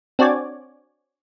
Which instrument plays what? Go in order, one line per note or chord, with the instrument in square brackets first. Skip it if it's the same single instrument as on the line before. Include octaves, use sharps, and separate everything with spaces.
[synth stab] C4 D4 F#4 C#5 D5 G#5